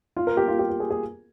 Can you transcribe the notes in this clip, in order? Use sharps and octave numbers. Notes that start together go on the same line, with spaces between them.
F4
A#4
G4
F4
G4
G4
G#4
G#4